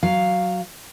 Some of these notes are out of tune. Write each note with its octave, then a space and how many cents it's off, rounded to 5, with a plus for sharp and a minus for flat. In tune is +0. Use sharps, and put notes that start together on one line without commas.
F#3 +0 F5 +0